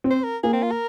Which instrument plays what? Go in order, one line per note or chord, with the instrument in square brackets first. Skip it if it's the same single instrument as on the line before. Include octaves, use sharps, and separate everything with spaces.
[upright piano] C4
[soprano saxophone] C5
A#4
[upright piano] A#3 [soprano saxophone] G#4
[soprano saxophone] C4
F4
A#4